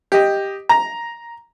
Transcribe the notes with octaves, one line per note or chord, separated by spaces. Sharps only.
G4 D#5
A#5